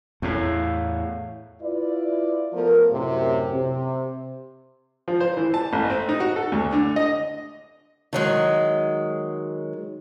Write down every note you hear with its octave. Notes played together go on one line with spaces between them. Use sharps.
E2 A2 C#5 F5
E4 F4 B4 D5
F3 A3 B3 A#4
F#2 A2 C3
C3
F3
C5
E3
A5
A1
C4
D#4
F#4
A4
D2
D3
D#5
D#3 F#3 G#3